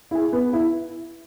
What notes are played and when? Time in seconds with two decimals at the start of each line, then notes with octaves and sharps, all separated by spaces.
0.11 E4 G#4
0.33 B3
0.53 E4